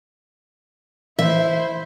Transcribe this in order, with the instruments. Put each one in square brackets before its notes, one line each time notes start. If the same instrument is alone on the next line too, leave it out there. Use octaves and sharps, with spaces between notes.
[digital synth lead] E3 [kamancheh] E4 C5 [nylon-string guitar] E5